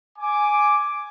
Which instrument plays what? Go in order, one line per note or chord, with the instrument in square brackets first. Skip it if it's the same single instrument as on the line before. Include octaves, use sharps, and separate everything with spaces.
[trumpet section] G#5 D6